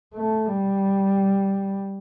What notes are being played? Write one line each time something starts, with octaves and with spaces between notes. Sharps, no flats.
A3
G3